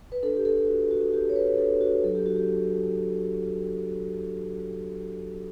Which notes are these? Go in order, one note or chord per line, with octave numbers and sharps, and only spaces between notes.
B4
D4 A4
G4
A4
F#4
F#4
F#4 G4
C#5
B4
D4 A4
F#4
F#3 A4
G4
F#4
G4
F#3